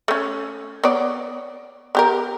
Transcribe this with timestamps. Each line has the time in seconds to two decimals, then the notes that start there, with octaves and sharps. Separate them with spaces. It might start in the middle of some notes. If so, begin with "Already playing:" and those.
0.08 A3 C#4
0.84 B3 C#5 D5
1.95 B3 G4 A#4